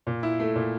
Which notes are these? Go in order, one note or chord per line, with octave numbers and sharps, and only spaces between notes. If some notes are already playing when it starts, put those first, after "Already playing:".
A#2
E4
A3
A#2